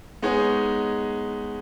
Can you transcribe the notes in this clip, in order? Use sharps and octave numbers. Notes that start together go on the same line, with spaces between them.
G#3 B3 D#4 G#4 C#5